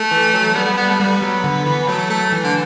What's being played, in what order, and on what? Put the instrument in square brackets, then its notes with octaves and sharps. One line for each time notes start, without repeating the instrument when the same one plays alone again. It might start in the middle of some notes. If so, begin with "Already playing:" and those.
Already playing: [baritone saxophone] A3
[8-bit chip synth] E3
F#3
[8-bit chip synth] G3 [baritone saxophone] B3
[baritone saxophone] B3
B3
A3
[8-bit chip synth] G3 [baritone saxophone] B3
[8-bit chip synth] F#3
D3
E3
[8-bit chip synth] F#3 [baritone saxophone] A3
[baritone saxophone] A3
[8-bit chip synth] E3
[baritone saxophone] D3